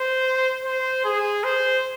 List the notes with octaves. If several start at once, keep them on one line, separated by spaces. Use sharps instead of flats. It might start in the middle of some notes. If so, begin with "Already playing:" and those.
Already playing: C5
C5
G#4
C5